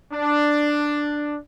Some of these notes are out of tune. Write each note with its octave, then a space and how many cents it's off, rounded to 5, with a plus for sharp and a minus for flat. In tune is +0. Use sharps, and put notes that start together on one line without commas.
D4 +5